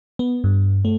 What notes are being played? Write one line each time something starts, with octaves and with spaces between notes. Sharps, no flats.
B3
G2
A3